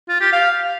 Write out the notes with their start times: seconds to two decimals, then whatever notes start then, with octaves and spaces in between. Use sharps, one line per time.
0.09 F4
0.21 G4
0.33 F5